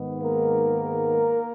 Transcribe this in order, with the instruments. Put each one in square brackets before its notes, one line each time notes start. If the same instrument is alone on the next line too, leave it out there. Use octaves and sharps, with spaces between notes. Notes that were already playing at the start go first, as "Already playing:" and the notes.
Already playing: [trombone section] G#2 D#3 G#3 B3
A#3 A#4